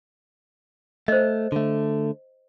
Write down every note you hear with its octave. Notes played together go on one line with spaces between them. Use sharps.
A3 C5 D#5
D3 A3